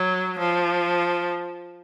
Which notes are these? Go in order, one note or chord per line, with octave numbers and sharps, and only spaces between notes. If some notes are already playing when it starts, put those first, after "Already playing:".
Already playing: F#3
F3